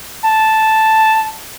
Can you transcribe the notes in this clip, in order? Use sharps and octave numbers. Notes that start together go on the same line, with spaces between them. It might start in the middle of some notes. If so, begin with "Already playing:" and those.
A5